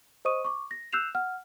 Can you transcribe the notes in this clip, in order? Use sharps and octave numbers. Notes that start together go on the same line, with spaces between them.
C5 D#5 C#6 D#6 D#7
C#6 D6
A#6
E6 F#6 G6 C7 E7 F7
F#5 F6